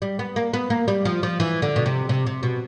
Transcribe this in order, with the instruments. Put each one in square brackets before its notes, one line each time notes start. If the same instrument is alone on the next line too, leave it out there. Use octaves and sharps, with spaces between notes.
[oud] G3
B3
A#3
B3
A#3
G3
F3
F3
E3
D3
B2
C3
C3
C3
B2